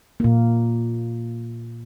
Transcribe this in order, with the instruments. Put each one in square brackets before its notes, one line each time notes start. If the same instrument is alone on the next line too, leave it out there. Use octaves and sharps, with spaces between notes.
[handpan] A#2 A#3